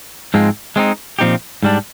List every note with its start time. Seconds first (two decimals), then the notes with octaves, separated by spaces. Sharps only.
0.34 G#2 F3 G#3 C4
0.76 G#3 C4 D#4
1.19 A#2 F3 C4 D#4 G4
1.63 G#2 G3 D4